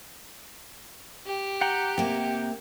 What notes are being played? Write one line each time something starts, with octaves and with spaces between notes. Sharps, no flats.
G4
F#5 G5 A#5
C3 A#3